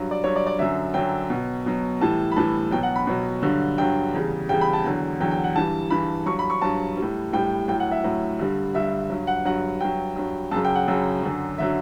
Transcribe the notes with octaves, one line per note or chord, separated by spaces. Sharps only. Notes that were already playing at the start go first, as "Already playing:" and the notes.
Already playing: G2 F#3
D5
G2 F#3 C#5
D5
D5
F#2 D3 F#3 E5
F#2 D3 F#3 G5
B2 F#3
B2 F#3
A2 E3 G3 A5
B5
A2 E3 G3 A5
B2 F#3 G5
F#5
B5
B2 F#3
G2 D3 F#3
G2 D3 F#3 G5
E2 C#3 G3
E2 C#3 G3 G5
B5
A5
E2 D3 F#3
E2 D3 F#3 G5
G5
F#5
G2 E3 G3 A5
G2 E3 G3 B5
G2 F#3 C#6
B5
C#6
G2 F#3 A5
G3
A2
A2 G3 G5
A2 F#3 G5
F#5
E5
A2 F#3
G2 D3 G3
G2 D3 G3 E5
G2 F#3
F#5
G2 F#3 F#5
G2 F#3 G5
G2 F#3
F#2 C#3 F#3 A5
G5
F#5
F#2 C#3 F#3
F#2 D3 F#3
D3 F#3 E5